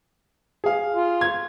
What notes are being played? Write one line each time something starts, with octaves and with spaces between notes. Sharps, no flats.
G#4 F5
F4
G#6